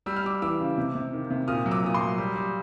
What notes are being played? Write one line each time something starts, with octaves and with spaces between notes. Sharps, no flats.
G3 E6
F6
G3 D6 E6
E3 D6 E6
C#3
C3
C3
D#3
C3
A#2 D#6 F6
F#3
D6 E6
A#2 D#6
C6 D6
F#3
G3
G3